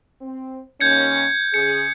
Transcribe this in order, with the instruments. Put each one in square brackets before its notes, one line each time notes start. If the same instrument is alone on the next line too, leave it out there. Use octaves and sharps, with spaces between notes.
[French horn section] C4
[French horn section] D#2 C#4 [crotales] G6 G#6 C#7
[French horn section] C#3 G#4 [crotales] C#7